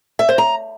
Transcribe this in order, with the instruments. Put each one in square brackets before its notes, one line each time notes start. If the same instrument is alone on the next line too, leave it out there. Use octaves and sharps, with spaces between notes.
[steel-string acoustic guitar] E5
C5
A#5